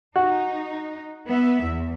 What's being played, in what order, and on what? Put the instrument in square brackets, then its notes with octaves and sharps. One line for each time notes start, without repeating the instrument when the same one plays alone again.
[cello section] D#4 [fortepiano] F#4
[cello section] B3 E5
E2